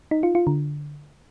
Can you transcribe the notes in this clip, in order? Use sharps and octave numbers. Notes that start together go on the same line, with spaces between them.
D#4
F4
F4
D3